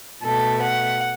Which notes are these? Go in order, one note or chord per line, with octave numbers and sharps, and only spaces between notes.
B2 A3 A4
F#5